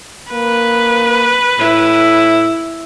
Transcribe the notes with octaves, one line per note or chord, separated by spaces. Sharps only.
A#3 B4
A2 E4